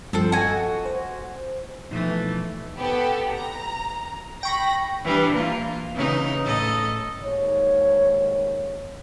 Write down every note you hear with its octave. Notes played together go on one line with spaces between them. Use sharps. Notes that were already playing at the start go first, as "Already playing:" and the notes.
G2 F3 C4 A4 C5
F#4 A4 D#5 G5 G#5
C5
B2 E3 F3 A3 D#4
B3 G4 A4
A#5
G5 B5 C#6 A#6
E3 G3 D4
A#3 F4
C#3 E3 D#4
A2 A4 D#5
D#2 G#2 C#5